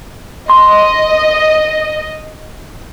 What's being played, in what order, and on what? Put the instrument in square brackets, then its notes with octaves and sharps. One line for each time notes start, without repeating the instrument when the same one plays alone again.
[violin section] D#5 [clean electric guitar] C6